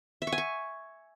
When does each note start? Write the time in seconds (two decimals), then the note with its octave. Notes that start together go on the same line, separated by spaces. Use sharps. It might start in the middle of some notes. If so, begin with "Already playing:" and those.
0.22 E5
0.27 C#6
0.32 G#5
0.38 C#6